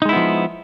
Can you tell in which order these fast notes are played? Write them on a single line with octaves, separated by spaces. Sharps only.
D#4 G#3 E4 B3 F3